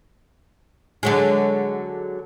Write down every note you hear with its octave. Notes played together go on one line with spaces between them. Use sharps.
D3 F#3 G#3